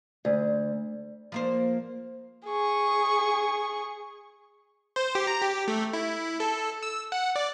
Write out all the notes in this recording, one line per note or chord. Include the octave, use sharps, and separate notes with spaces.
D2
F3 A#3 C5
G#4 C#6
C5
G4
A#5
G4
A3
E4
A4
E6
F#5
D5